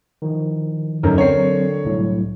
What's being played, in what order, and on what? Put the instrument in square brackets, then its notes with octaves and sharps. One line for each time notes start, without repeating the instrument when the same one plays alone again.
[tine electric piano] D#3 F3
[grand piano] F#2 [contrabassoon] D3 [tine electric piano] D#4 A#4 C#5
[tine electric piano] F#3 C4 C7 [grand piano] A#4 C#5
[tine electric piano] C2 A2 F#3